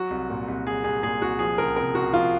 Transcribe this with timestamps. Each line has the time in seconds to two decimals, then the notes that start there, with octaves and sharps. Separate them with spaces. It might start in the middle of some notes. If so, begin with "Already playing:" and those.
Already playing: F#3 F#4
0.11 C2
0.30 A#2
0.48 C2
0.66 F#3 G#4
0.84 C2 G#4
1.03 A#2 G#4
1.21 C2 F#4
1.39 F3 G#4
1.58 C#2 A#4
1.76 C3 A#4
1.95 C#2 F#4
2.13 F3 F4